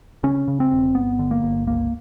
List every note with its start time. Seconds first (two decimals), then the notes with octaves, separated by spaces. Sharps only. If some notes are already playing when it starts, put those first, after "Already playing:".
0.23 C#3 C#4
0.48 C#3
0.60 C4
0.72 E1
0.95 G1 B3
1.19 D3
1.31 A#3
1.43 G1
1.67 C#2 A#3